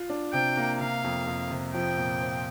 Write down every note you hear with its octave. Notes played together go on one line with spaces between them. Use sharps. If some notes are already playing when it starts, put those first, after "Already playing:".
Already playing: F4
D4
C3 G5
A#3
C3 F5
F2
F2
C3
F3 G5
A#2
C4